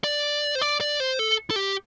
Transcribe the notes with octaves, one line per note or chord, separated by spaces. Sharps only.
D5
C5
D5
D5
C5
A4
A4
G4